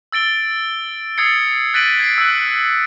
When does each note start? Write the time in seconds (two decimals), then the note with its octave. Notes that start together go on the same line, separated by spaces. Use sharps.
0.12 E6 A6 D7 G7
1.18 D#6 E6 G#6 A6 C7 C#7
1.74 F#6 A6 B6 D7 D#7 F#7
2.00 G#6 C7 D7
2.18 E6 F#6